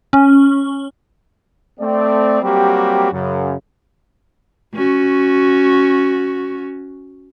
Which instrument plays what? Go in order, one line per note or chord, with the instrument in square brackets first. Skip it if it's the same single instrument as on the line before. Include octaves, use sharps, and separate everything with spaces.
[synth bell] C#4
[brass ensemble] A3 C4 D5
F#3 G3 A#3 C4 F#4 G4
F#2 C#3
[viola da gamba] C#4 F#4